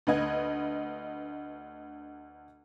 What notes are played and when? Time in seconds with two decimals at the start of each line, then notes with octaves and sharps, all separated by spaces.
0.07 D2 B4 D#5 G#6